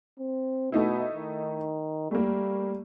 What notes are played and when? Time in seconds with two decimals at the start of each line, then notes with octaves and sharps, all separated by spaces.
0.19 C4
0.72 B2 A3 D#4 E4
1.15 D#3
2.11 G3 A3 A#3